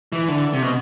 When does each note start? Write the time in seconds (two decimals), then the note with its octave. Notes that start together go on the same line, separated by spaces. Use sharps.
0.12 E3
0.28 D3
0.53 C3
0.62 B2